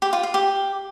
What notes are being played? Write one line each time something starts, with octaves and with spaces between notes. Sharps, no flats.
G4
F4
F5
G4